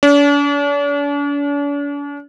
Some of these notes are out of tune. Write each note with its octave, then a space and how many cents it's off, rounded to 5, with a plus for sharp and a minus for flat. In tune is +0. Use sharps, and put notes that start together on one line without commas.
D4 -45